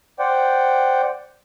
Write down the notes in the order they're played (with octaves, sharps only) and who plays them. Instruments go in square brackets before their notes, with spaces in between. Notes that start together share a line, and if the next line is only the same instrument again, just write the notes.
[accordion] C5 D5 F#5 G5